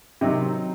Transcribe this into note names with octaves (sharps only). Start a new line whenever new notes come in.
C3 D#3 F#3 C4 D#4